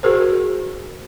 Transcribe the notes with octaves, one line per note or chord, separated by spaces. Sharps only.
F#4 G#4 A#4 C5